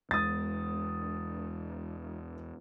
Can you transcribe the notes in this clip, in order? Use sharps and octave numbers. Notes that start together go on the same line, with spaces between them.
E2 G#3 D#6 A6